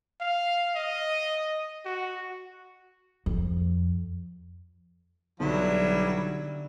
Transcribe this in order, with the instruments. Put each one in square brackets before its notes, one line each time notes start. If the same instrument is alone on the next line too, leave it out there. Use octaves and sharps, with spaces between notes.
[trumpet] F5
D#5
F#4
[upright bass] F2
[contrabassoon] B1 [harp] D3 [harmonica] F#3 G3 E4